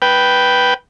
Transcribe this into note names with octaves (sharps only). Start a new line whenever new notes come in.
B4 G5